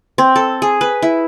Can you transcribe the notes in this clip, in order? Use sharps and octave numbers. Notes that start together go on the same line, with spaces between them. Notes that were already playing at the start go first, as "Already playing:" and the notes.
C4
A4
G#4
B4
E4